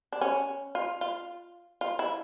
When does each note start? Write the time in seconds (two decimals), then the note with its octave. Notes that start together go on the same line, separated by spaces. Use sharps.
0.13 D4
0.21 C#4
0.75 F4
1.01 F4
1.81 F4
1.99 E4